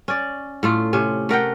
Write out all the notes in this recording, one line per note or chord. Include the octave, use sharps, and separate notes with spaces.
C#4 D5
A2 A3 F4
C3 C#4
A3 A#4 F#5 G5